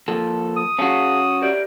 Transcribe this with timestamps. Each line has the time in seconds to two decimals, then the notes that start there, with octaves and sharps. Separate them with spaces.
0.08 F3 A#3 A4
0.57 D#6
0.79 C#4 F#4 G#4 F5 A5
1.42 G4 A#4 D5